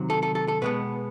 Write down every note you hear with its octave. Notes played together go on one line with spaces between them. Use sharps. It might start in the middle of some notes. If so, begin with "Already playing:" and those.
Already playing: C3 D#3 F#3
A4
A4
A4
A4
B2 G#3 B3 B4